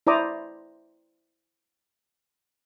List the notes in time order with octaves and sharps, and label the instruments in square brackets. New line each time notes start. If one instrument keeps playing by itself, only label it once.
[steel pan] E4 C5 D5 A#5 D6 D#6